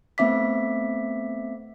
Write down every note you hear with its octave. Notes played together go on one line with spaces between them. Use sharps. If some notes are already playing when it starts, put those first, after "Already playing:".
A3 B3 C4 E5 D6 B6